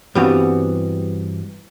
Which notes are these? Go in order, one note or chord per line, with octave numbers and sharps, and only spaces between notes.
G2 E3 G3 B3 C4 F#4